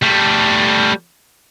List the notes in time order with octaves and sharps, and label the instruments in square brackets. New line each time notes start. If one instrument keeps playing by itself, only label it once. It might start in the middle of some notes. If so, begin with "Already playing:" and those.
[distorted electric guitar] G3 A3